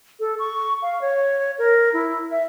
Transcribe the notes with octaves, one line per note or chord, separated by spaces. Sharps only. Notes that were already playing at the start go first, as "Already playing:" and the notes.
A4
C#6
F5
C#5
A#4
E4
E5